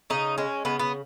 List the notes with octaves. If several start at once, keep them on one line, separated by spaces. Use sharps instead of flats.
C#3 D#4
G#3 C#4
C#3 B3
B3